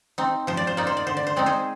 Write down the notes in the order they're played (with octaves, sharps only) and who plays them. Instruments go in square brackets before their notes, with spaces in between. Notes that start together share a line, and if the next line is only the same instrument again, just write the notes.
[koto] C4 D#4
F3 C5
D5
C5
A#3 D#4 D5
C5
D5
D3 C5
D5
C5
G#3 C4 D#4 D5
G#4 C5